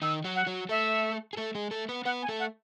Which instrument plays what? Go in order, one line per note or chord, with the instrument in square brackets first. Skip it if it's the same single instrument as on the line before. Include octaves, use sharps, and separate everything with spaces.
[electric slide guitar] D#3 D#4 [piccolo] E6
[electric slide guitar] F#3 F#4
[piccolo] F#5
[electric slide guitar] F#3 F#4
[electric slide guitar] A3 A4 [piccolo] E5
[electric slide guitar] G#4
A3 A4
G#3 G#4
A3 A4
B3 B4
[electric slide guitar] B3 B4 [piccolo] F#5
[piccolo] G#5
[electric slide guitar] A3 A4
[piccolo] F#5